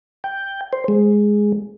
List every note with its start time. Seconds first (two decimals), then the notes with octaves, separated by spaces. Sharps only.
0.24 G5
0.73 C5
0.88 G#3